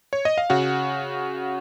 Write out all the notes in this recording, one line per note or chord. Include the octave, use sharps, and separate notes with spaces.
C#5
D#5
F5
C#3 F#4 F#5